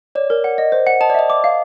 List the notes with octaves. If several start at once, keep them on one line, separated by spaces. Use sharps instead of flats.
C#5 D5
A#4
F#5
D#5
C5
F#5
D#5 A5
D5
D#5 E5
D6
F5